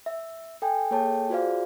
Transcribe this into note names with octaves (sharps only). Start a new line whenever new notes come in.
E5
A4 G5 G#5
A#3 G#4 A4 C#5 G5 A5
F4 F#4 G#4 C5 D5 F5